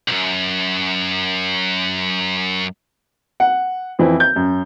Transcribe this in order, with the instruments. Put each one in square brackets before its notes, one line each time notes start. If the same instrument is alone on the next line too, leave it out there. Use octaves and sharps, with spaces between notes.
[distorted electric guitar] C2 F#2
[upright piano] F#5
F2 E3 C4 E4
G6
F#2